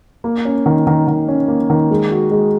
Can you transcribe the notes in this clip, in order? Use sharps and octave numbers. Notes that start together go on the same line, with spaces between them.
A#3
C#4
D#3
D#3
D#3
C#4
A#3
D#3
G#3
F#4
G#3